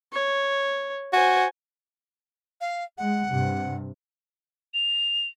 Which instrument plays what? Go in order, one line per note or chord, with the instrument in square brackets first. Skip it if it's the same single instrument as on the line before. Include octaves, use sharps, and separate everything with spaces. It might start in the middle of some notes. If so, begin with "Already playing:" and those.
[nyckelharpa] C#5
[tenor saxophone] F#4 [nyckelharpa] C5 G#5
[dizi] F5
[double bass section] G#3 [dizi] F#5
[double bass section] G2 C3
[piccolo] F7